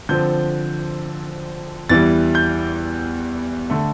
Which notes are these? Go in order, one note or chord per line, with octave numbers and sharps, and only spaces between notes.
D3 F3 C4 G6
E2 E3 G3 A6
G6
D3 A3